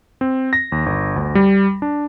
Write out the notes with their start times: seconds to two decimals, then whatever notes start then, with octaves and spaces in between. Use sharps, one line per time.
0.21 C4
0.53 A#6
0.72 D#2
0.86 G1
1.16 D2
1.35 G3
1.82 D4